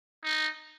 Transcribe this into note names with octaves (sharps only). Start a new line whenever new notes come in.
D#4